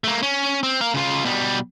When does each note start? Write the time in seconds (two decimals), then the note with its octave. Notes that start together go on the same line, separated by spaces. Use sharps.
0.04 A3 A#3
0.23 C#4
0.63 C4
0.81 A#4 F5
0.94 C#3 F4
1.25 B2 G3